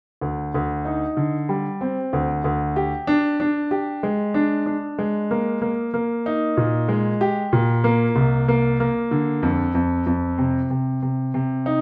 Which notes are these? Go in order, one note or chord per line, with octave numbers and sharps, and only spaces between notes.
D2
D2
D#4
D3
G3
C4
D2
D2
G4
D4
D4
G4
G#3
D4
D4
G#3
A#3
A#3
A#3
D#4
A#2
G#3
G4
A#2
A#3
C2
A#3
A#3
D3
F2
F2
F2
C3
C3
C3
C3
D#4